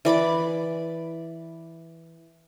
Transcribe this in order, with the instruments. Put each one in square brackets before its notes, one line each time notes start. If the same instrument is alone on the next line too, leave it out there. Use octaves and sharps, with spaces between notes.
[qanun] E3 D5 B5 D6